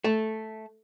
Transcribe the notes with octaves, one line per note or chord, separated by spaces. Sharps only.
A3